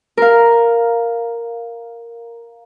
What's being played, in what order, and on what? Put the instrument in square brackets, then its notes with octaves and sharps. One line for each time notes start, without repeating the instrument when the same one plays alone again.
[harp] A#4 F5